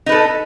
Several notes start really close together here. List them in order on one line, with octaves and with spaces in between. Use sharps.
D#4 B4 A4